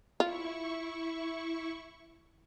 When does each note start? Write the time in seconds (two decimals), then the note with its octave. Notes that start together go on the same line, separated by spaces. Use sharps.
0.20 E4 F4 C#6